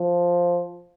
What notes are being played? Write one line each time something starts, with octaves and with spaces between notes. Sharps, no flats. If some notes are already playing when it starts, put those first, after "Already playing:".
Already playing: F3